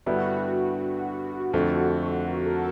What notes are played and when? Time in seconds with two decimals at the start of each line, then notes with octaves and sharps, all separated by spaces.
0.06 G2 D3 G3 B3 E4 F#4
1.54 F2 D3 F3 A3
2.27 A#4
2.45 A4